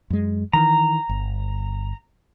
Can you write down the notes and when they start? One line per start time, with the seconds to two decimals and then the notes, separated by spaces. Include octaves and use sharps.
0.10 F#2 G#3
0.53 D#3 E3 A#5
1.09 G1